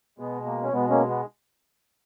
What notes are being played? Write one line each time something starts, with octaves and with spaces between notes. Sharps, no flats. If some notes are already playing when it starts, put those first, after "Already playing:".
B2 G#3 B3
A#3
C#4
B2 G#3 B3
A#3 C#4
B3